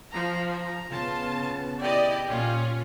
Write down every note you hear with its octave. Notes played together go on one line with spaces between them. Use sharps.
F3 A#5
A#5
C#3 B3 F4 A5
E4 G4 D5 D#5
A#2 C#4 F4